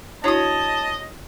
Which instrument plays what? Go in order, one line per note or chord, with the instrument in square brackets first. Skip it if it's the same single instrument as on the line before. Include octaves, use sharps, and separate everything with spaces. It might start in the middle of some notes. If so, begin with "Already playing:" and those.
[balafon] D4 E4 F#4 [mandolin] C#5 D#6 [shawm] D#5 [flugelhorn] A5